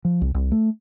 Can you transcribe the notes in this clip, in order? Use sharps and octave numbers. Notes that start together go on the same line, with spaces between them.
F3
C2
C2
A3